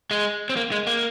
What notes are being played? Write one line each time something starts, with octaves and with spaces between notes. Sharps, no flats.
G#3
C4
A#3
G#3
A#3